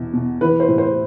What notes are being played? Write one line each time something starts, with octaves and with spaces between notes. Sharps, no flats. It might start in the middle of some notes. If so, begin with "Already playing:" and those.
Already playing: E2 B2
B2
E3 B4
C5
A2
C5